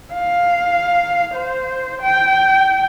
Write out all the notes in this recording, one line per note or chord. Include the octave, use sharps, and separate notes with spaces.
F5
C5
G5